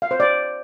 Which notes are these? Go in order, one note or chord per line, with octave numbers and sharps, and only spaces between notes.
F5
C5
D5